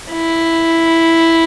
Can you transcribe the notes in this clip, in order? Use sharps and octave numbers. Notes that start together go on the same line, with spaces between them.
E4